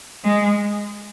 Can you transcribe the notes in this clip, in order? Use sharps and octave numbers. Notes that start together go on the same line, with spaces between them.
G#3